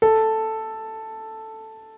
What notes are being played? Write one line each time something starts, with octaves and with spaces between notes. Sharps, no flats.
A4